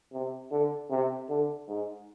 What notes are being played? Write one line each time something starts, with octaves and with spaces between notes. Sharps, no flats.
C3
D3
C3
D3
G#2